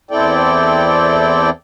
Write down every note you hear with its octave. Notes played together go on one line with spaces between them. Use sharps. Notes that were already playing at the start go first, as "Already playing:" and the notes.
E2 C4 E4 A4 D5 G5